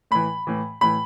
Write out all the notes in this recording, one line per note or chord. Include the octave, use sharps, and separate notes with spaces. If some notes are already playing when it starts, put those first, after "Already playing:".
A2 E3 B5
A2 E3
A2 E3 B5